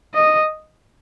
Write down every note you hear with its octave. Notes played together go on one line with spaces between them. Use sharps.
D#5